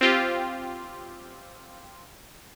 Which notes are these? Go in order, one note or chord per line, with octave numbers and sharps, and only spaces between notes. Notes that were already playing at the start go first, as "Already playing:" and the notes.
C4 F4 G4